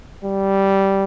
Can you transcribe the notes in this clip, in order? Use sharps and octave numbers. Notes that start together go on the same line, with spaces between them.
G3